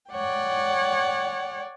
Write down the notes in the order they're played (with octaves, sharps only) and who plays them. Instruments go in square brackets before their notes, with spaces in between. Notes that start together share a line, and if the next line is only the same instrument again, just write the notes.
[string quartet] C#5 D5 F#5 G5